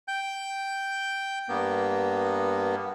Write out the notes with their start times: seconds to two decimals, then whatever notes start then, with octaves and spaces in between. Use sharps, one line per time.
0.08 G5 G6
1.49 G2 A#3 B3